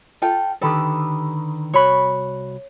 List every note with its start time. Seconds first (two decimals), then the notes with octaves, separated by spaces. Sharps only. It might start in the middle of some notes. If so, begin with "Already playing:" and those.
0.22 F4 A4 G5
0.61 D3 D#3 G4 A4 B4
1.74 C2 F#4 C#5 B5